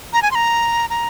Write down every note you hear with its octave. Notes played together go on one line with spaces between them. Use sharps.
A#5
G#5
C6
A#5
A#5